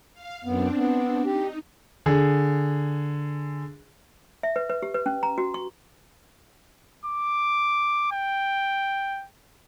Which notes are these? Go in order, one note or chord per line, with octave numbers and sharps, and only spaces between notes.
F5
F#2 B3 C4 D4
B3
D#4 G4
D3 G#4
E5
B4
B4
G4
B4
C#4
A#5
F#4
C#6
D6
G5